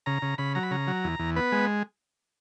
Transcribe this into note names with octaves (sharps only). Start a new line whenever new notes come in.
C#3 A#5
C#3
C#3 B5
F#3 A#5
B5
C#3 A#5
F#3
E2
E2
B3 B4
G#3